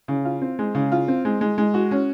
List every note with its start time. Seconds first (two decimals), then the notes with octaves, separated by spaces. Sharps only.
0.08 C#3
0.25 F4
0.42 C4
0.59 G#3
0.75 C#3
0.92 F4
1.08 C4
1.25 G#3
1.41 G#3
1.58 G#3
1.74 F#4
1.91 C#4